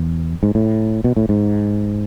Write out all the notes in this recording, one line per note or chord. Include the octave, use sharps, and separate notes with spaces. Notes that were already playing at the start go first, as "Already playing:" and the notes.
Already playing: E2
G#2
A2
B2
A2
G#2